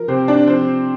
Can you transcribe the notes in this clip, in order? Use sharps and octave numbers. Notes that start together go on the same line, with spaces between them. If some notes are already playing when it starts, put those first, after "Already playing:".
Already playing: F3 A#4
C3 C4 C5
D4 D5
F3 C4 C5